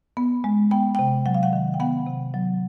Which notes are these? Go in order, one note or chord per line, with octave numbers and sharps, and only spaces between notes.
B3
G#3
B3 G5
C3 G5
F#3 F#5
F5
F#5
D#3
G5
B3 F#5
C3
F#3